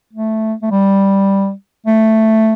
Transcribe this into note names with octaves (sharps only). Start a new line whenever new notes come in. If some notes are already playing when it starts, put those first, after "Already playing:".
A3
A3
G3
A3